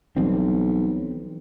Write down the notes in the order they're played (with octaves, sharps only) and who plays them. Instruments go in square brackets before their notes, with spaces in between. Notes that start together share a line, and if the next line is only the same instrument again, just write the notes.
[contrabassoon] B1 [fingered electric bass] E3 G3 C4